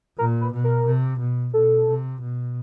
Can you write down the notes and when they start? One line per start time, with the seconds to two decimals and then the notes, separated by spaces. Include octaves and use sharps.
0.18 A#2 A#4
0.41 B4
0.53 B2
0.64 A#4
0.86 C3
1.19 B2
1.53 B2 A4
1.88 C3
2.21 B2